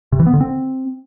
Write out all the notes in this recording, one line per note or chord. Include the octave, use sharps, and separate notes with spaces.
C3
E3
B3
D3
C4